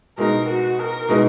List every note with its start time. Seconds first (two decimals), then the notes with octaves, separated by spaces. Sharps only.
0.18 B2 G#3 B3 D#4 A#4
0.49 F#4
0.79 A#4
1.09 B2 G#3 B3 D#4